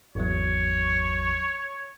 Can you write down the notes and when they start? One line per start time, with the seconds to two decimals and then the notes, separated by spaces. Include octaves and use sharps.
0.15 G#1 E2 F#3 C#5